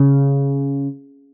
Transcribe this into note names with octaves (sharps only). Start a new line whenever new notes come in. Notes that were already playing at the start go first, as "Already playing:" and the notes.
Already playing: C#3